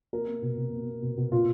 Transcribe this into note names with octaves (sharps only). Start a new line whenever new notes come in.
A#3 A#4
A#3
B2
B2
A#3
A#3
B2
B2
A#2 F4